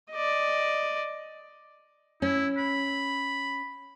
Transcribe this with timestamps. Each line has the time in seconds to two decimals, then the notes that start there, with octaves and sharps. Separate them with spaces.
0.11 D5 D#5
2.22 C#4 E4
2.58 B5